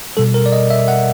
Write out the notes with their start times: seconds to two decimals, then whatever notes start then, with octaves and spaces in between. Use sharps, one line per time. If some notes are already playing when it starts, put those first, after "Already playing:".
0.17 B2 G3 A4
0.34 A#4
0.46 D5
0.52 D#5
0.70 E5
0.88 F#5